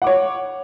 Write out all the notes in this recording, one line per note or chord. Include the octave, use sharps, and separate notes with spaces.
C#5 F#5 D6